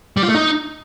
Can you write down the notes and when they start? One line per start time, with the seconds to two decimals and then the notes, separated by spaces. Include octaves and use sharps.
0.17 G3
0.23 F4
0.29 A3
0.34 D#4